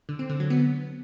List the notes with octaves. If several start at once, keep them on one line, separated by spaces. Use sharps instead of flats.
D3
C4
D3
F#3
B3